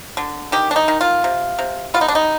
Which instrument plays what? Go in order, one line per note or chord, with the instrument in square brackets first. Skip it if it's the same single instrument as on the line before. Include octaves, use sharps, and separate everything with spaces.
[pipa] D3
D#3 G4
D4
D#4
D#3
F4
C3
C3
B3 F4
D#4
D4
D#4